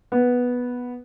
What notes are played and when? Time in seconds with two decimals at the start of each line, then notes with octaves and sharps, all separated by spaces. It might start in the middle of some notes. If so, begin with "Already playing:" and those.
0.12 B3